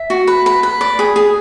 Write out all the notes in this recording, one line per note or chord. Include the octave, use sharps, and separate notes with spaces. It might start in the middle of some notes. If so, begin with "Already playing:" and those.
Already playing: E5
F#4
B4
B4
B4
D5
G#4
G#4